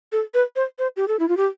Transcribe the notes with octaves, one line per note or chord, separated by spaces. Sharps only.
A4
B4
C5
C5
G4
A4
E4
F4
G4